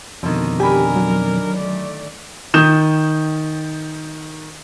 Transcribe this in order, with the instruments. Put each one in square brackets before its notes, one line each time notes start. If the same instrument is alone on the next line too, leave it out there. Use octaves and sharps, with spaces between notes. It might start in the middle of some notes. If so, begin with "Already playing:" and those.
[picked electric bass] F2 B2 [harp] D3 D#3
[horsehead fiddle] D4 A#4 [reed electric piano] G4 [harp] G#5 B5
[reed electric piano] F#3
[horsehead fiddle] A3 D5
[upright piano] D#3 D#6 G6 E7